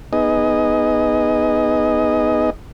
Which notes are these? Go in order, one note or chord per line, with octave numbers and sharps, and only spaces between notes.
B3 D#4 G#4 D#5